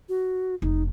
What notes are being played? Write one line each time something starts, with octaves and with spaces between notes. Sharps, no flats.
F#4
F1 D#4